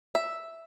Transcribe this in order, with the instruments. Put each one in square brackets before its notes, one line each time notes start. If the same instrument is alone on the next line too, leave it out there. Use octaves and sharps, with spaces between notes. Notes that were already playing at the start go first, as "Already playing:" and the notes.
[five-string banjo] E5